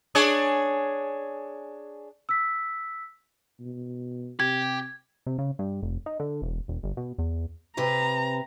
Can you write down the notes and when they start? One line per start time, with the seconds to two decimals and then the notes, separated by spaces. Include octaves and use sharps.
0.15 D4 G#4 C#5
2.29 E6 B6
3.60 B2
4.40 C3 G4 G#6
5.26 C3
5.38 C#3
5.59 G2
5.83 F1
6.06 D#4
6.20 D3
6.42 E1
6.68 E1
6.83 G1
6.97 B2
7.18 E2
7.77 C3 B4 C5 A#5